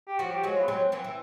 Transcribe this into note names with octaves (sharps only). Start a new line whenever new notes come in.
G4
F3 G3 F#4
G4
F#3 G#3 F#4
F4
B3
F#3 G#3 C4
E3 F#3 C4
E3